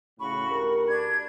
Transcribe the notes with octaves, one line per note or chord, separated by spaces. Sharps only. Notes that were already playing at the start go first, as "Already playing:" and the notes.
A2 C#3 F#4 B5 C#6
D2 G4 A#4
D4 G#6